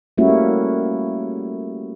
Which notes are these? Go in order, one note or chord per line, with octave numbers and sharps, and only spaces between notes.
G3 A3 A#3 C#4 E4 F#4